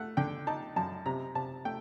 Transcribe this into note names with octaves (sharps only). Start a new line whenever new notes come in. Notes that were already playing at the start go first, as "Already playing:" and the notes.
Already playing: A3 F#5
D3 G5
D#4 A5
F#2 A5
C3 A#5
C3 A5
A3 G5